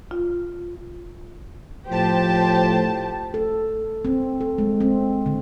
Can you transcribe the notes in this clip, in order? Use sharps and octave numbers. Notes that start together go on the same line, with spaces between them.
F4
A2 F3 G4 C5 A5
A4
C4
A4
G#3
C4
D3